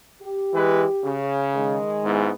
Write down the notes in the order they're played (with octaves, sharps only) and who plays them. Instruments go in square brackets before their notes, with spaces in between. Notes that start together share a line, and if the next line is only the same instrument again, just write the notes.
[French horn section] G4
[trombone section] E3 G#3 B4
C#3
[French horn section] D#3 G#3
[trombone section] G#2 B3 E4